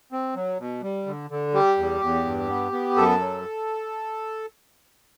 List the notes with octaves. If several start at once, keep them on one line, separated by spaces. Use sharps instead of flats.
C4
F#3
B2
G3
D3
D3
G3 G4
E2
E2
G2
B3
B3
F#2 A4
F#3